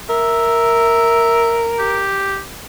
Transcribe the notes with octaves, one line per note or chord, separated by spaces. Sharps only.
A#4 E5
G4